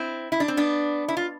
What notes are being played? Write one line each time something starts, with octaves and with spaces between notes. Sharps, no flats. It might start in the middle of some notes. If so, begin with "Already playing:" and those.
Already playing: C4 E4
E4
D4
C4
B3 D4
E4
F4